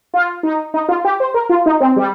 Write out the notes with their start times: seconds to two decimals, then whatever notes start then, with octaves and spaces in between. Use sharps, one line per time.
0.14 F4
0.43 D#4
0.74 D#4
0.89 F4
1.05 G4
1.20 C5
1.34 A#4
1.50 F4
1.66 D#4
1.80 C4
1.96 G3